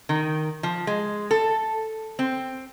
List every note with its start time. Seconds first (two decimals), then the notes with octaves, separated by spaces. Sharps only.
0.09 D#3
0.63 F3
0.87 G#3
1.31 A4
2.19 C4